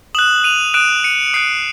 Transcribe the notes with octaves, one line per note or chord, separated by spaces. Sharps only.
D#6 F#6 E7 F#7
D#7 F7
D#6 F#6 D7 E7
C#7 D#7
C#7
D#6 F#6 C7 D7